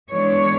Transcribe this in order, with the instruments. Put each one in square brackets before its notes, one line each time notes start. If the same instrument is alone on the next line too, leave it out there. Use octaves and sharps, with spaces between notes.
[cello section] E3 G#3 B3 D4 C#5